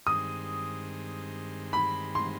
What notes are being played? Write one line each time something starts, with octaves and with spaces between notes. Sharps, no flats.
G2 D#3 G#3 C4 D#6
B5
C6